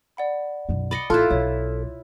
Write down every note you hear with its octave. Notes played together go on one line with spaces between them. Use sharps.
D5 F#5 B5
B1 F#2
D5 D#5 B5 C#7
A#1 E4 F4 A4 F6 F#6
B1 C#5